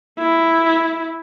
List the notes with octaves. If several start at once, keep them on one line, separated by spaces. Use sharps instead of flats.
E4